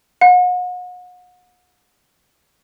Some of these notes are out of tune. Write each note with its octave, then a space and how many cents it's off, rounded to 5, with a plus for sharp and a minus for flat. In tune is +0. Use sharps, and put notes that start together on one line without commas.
F#5 -40